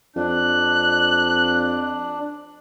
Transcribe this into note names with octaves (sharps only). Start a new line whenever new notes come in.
F2 D4 F#6